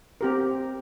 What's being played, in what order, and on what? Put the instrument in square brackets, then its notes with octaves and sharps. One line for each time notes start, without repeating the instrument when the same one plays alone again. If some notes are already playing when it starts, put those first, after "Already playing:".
[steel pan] C4 G4 A#4